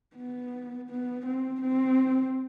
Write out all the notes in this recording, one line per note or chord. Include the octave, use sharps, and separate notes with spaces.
B3
B3
C4
C4